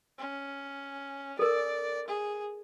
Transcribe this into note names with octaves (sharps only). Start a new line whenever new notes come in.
C#4
A4 A#4 D5
G#4